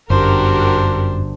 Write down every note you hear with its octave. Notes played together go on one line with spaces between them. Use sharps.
G1 F#2 D4 F#4 G4 A#4 C5